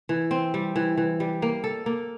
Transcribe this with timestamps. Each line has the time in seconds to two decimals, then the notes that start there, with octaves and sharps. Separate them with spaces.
0.09 E3
0.31 C4
0.54 G3
0.76 E3
0.98 E3
1.20 G3
1.42 A#3
1.64 A4
1.86 A#3